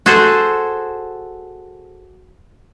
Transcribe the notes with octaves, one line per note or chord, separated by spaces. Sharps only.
F#4 G#4 A4 C5